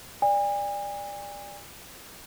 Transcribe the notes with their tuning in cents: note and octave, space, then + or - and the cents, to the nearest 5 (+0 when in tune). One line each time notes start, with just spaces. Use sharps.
D5 +0 G#5 -40